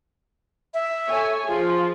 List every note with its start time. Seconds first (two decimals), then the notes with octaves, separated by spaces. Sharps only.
0.74 E5
1.08 A4 C#5 G#5
1.48 F3 F4 G#4